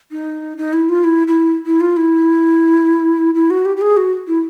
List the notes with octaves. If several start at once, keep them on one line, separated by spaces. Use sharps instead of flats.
D#4
D#4
E4
F4
E4
E4
E4
F4
E4
E4
F#4
G4
G4
G#4
F#4
E4